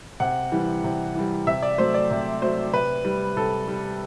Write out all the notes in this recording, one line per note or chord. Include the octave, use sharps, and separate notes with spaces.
C3 F#5
E3 G3
C3
E3 G3
C3 E5
D5
F#3 A3 C5
D5
C3
F#3 A3 C5
C3 B4
G3
C3 A4
G3